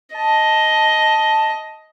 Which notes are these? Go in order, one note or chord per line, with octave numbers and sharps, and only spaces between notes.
D#5 A5